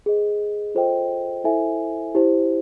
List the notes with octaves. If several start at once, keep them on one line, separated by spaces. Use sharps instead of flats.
G#4 B4 D#5
F4 A4 C5 D#5 G5
E4 A4 C5 E5 G#5
E4 G4 C5